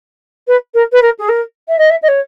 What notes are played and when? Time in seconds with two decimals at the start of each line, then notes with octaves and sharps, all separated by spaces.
0.47 B4
0.74 A#4
0.92 B4
1.02 A#4
1.19 G#4
1.29 A#4
1.68 E5
1.78 D#5
1.90 E5
2.02 D#5
2.08 C#5